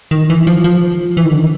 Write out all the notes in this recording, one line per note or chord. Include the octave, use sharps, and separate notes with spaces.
D#3
E3
F3
F3
E3
D#3
D3
D#3